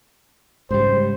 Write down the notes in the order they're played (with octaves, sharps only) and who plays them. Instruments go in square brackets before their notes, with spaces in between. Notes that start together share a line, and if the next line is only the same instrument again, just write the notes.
[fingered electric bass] G#2 C#3 G3 [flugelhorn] C5